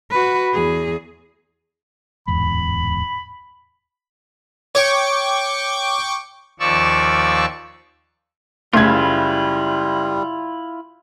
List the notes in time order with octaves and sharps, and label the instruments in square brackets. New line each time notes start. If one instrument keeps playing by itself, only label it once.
[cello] F#4 B4
E2 G#4
[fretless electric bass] D1 E2 G#2 [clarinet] B5
[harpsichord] C#5 [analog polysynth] G5 C#6 D6
[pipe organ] D#2 F3 D5 C#6 E6
[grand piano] F#1 C#3 G#6 [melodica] G3 [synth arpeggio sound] A3 C6 [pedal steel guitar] E4 F4